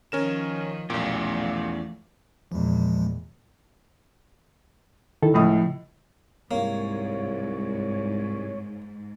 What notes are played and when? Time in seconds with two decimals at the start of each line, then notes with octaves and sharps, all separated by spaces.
0.12 D#3 F3 C#4 A#4 E7
0.90 B1 E2 A#2 F3 A3 C#4 G4 D5
2.52 E2 A#2 F3 G#3
5.23 D#3 E4 A4
5.34 C#2 A2 F3 D#6
6.51 C2 G#2 A#3 C#5